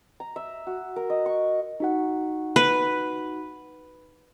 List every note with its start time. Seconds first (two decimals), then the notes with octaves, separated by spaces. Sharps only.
0.20 A#5
0.36 E5
0.67 F#4
0.96 A#4
1.10 D#5
1.26 C#6
1.80 D#4 F#4 F#5
2.56 B4